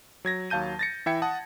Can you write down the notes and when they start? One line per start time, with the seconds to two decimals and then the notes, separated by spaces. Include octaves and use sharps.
0.25 F#3 G#6 A#6
0.50 D#2 F#3 F5 A5 G6 D#7
0.79 A6 A#6 C#7
1.06 E3 E4 E5 G5 G#6 C#7
1.22 F#5 A5 D#6